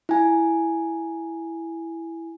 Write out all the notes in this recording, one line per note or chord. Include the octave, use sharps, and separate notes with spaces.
E4 G#5